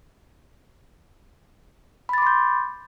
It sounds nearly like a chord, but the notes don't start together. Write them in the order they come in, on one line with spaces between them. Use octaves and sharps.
B5 A6 D6 C6 G6